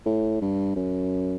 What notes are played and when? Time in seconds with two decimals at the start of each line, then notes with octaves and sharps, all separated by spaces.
0.06 A2
0.41 G2
0.76 F#2